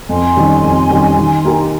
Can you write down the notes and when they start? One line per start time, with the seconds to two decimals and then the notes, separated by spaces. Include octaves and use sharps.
0.09 F2 G#5 C6
0.36 D#3 G3 C#4 G4
0.64 F2
0.90 D#3 G3 C#4 G4
1.18 D#3
1.44 A#3 D#4 G4 A#4